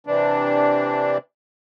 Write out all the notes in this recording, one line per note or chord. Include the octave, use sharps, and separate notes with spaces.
C3 E3 D4